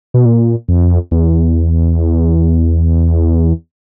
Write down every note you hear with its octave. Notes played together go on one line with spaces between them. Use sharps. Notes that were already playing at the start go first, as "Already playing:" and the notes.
B2
A#2
F2
E2